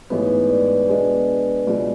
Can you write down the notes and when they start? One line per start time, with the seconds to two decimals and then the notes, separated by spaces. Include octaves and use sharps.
0.10 A1 G#2 G#3 B3 B4
0.50 D5
0.89 B2 G#3 D4
1.67 C#2 B2 G#3 D5